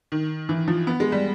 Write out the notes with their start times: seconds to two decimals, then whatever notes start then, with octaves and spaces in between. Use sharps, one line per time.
0.12 D#3
0.49 E3
0.68 F3
0.87 B3
1.00 G#3
1.12 G3